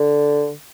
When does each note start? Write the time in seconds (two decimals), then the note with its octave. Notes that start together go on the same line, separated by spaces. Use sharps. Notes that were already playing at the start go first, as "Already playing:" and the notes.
Already playing: D3